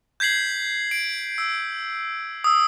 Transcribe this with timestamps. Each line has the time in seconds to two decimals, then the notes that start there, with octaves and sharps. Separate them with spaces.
0.20 G6 G#6 B6 C7 F#7
0.91 D7
1.38 E6
2.44 D#6 E6